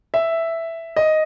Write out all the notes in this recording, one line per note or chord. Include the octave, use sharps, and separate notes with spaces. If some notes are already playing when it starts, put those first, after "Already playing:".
E5
D#5